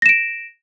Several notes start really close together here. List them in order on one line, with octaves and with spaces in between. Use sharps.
A#6 E7 D7